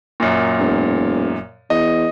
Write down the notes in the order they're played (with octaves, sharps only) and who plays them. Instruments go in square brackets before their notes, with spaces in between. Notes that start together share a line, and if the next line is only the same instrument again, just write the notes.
[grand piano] F#2 A#2
[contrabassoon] E1
[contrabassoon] E2 [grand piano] D#5